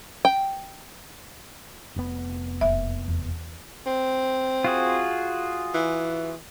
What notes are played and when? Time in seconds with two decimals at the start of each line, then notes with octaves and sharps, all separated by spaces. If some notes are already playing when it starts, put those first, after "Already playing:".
0.25 G5
1.96 F1 B3
2.61 E1 A#3 E5
3.08 E2
3.86 C4
4.64 F4 F#4 G#4
5.74 E3